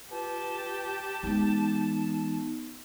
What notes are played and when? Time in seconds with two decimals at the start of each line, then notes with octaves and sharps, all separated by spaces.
0.11 F4 G4 B4 A5
1.23 E3 G#3 B3 D#4